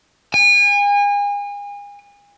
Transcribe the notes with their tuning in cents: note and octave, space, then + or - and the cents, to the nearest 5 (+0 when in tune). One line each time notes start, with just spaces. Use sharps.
G#5 -35